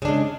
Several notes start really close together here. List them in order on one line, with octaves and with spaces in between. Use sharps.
C#3 D4 G#3